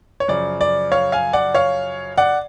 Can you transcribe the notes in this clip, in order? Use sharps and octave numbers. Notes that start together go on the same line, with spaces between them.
C#5
F#2 C#3 F3 D5
D5
C#5 F5
F5 G#5
D5 F#5
C#5 F5
D5 F#5